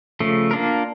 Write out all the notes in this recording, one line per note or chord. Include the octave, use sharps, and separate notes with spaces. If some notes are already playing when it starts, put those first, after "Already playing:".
C#3 F3 A3
A#3 D4 F4 A#4